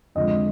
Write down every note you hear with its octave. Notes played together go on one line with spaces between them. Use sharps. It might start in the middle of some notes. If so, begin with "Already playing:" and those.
F2 D3 F3 G#3 D#5